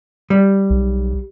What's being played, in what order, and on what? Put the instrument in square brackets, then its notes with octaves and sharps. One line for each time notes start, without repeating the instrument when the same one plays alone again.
[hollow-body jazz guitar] G3
[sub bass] B1